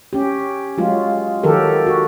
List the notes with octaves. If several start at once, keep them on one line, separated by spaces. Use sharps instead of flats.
C#4 G4
F#3 G#3 F4
D#3 F#3 G4 A4 A#4
F#4